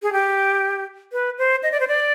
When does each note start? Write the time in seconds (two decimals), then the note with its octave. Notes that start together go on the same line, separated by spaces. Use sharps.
0.03 G#4
0.13 G4
1.13 B4
1.38 C5
1.63 D#5
1.72 D5
1.80 C5
1.88 D5